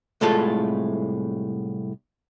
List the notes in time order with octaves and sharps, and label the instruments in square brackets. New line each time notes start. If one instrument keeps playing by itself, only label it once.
[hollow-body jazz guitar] C2 A2 G#3 A3 F4 A4